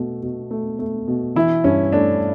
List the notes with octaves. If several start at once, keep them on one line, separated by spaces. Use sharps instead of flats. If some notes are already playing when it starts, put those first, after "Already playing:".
Already playing: B2 A3
B2
A3
A3
B2
E3 E4
G2 C#4
A3 D4